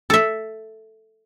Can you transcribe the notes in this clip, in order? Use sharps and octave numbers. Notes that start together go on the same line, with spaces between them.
A4 E5